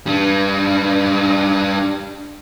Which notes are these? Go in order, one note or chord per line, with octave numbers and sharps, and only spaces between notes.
G3 D4